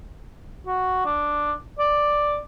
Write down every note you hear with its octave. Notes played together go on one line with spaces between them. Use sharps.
F#4
D4
D5